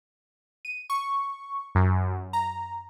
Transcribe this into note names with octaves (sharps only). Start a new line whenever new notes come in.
D#7
C#6
F#2
A#5